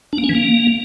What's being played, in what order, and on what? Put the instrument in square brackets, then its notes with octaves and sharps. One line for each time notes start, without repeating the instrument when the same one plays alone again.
[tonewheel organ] D4
A#3
C#4
E3
A#3